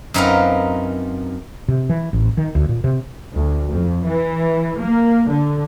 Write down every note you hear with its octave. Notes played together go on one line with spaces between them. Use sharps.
F#2 C4 D#4 A#4 B4 F5
C3
E3
A1
D#3
D2
A#2
C3
D2
F2
E3
A#3
D3